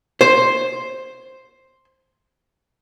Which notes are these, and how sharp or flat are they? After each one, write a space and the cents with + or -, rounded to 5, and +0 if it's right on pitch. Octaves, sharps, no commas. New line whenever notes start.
C5 +5